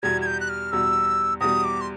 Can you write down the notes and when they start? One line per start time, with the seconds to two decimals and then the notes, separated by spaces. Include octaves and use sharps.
0.03 E2 B2 G3 G#6
0.22 G#6
0.27 G6
0.40 F#6
0.49 F6
0.72 E2 B2 G3 E6
1.41 E2 B2 G3 D#6
1.64 D6
1.81 C6